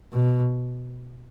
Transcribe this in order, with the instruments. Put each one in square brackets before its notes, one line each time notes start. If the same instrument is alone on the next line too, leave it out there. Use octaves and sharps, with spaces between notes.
[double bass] B2